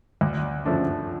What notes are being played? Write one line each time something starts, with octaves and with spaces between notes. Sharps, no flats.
D2
C#3 F3 A3 D4